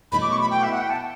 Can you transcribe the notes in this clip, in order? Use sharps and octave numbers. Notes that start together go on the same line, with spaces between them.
B2 F#3 A3 E4 A4 B5
D6
C#6
B5
G5
E5
F#5
G5
A5